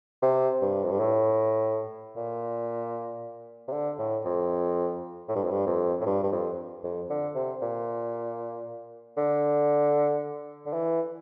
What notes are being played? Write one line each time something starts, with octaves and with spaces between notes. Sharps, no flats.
C3
G2
F2
G2
A2
A#2
C3
D3
A2
F2
A2
G2
F2
G2
F2
A2
G2
G2
F2
F2
D3
C3
A#2
D3
D3
E3